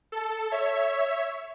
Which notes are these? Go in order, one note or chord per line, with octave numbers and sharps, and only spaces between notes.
A4
C#5 E5